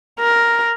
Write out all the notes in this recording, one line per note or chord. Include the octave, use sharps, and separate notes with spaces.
A#4